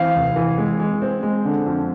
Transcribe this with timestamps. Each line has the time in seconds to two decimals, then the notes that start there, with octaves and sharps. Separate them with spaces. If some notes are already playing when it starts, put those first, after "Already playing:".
Already playing: E3 C4 F5
0.15 F1
0.36 E3
0.58 G#3
0.80 G#3
1.02 C4
1.23 G#3
1.45 D3
1.66 F2